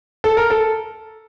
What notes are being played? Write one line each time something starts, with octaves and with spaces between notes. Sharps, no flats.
A4
A#4
A4